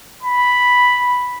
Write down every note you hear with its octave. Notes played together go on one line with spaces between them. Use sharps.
B5